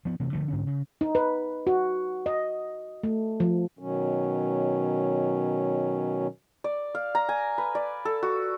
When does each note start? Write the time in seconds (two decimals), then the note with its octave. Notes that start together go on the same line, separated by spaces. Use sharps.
0.05 F3 B3
0.20 C3 E3 A3
0.33 D3 F3 A3
0.48 G#2 D3 C#4
0.67 C#3
1.01 D#4
1.15 B4
1.67 F#4
2.26 D#5
3.03 A3
3.40 F3
3.79 B2 D#3 F#3 C#4
6.64 D5
6.95 F5
7.15 A#5
7.29 G#5
7.58 B4
7.75 D5
8.05 A4
8.23 F#4